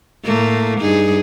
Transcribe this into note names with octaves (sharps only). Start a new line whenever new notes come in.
A2 A3 A#3
G2 D#4 G#4